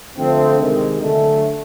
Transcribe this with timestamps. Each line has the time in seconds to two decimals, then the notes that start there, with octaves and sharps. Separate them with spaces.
0.16 D3 F3 A3 C4
0.59 C3 D#3 G#3
1.01 D3 F#3 A3